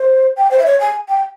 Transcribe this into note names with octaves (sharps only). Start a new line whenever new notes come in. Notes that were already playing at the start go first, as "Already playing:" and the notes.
Already playing: C5
G5
C5
E5
C#5
G#5
G5